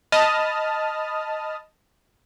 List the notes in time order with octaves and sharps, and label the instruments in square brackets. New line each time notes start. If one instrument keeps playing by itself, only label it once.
[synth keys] D#5 A5 B5 D#6 F6